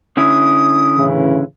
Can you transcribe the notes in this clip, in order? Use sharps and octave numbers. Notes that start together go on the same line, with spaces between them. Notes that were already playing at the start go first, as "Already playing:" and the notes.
D3 C#4 E4 D#6
A2 C#3 E3